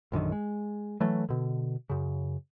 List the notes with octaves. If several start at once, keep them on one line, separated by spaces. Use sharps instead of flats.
A#1 F#2 D3 D#3
G#3
E3 F#3 A3
B2 D3
F#2 C#3